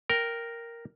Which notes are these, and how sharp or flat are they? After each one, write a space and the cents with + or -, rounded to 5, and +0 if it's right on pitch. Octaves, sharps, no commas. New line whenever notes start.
A#4 +0 G5 +0